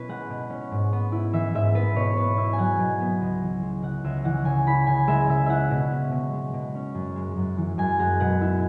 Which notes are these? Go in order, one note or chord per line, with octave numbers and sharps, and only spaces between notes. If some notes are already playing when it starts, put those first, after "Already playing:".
Already playing: B2 C#4 E4 B4
G#3 F#5
B2
C#4
G#2
B3
E4
E3 E5
G#2 E5
B3 B4
B2 C#5
B3 B4
E4 E5
G#5
F#3 F#5
B2
B3
C#2
E3
G#3
C#3 F#5
C#2 E5
E3 F#5
C#3 G#5
E4 B5
C#3 G#5
G#3 E5
C#3 E5
E4 E5 F#5
B2
C#4
B2
G#3
B2
C#4
F#2
G#3
F#2
E3
F#2 G#5
G#3 F#5
B2 F#5
E4